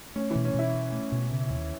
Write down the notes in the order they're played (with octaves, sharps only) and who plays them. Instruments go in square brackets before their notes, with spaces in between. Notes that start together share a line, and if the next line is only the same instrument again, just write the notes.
[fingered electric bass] A3 [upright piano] C#4
[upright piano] E3
[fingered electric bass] B2
[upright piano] C#4
[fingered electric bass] B2 [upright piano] E4
[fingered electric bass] C#4
A3
B2
C#3
D#2